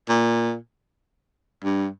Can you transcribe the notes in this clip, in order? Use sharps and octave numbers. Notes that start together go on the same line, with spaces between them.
A#2
G2